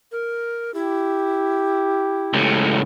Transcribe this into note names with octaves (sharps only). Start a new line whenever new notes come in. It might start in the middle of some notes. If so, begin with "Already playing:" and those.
A#4
E4 G4
C#2 A2